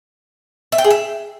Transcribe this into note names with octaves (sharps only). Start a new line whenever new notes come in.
E5
G5
G#4
E5